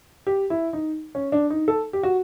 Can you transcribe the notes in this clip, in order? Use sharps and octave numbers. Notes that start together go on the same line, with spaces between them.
G4
E4
D#4
C#4
D4
D#4
A4
G4
F#4